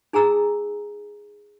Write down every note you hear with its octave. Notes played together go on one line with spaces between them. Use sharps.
D#4 G#4 G#5 A#5 E6